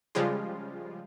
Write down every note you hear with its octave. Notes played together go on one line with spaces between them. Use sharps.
C#3 F3 G3 G#3 F4